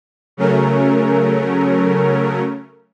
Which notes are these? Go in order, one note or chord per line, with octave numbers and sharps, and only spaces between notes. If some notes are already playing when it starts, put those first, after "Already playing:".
C#3 F#3 A3 C#4 A#4